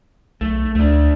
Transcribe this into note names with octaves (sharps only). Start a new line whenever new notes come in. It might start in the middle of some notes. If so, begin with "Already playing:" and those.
B1 A3
D2 A3 D4